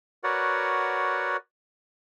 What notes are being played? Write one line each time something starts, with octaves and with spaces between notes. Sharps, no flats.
F#4 A#4 B4 C#5 D5 F#5